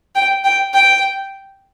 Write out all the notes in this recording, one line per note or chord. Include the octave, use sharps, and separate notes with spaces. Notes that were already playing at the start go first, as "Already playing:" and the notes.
G5
G5
G5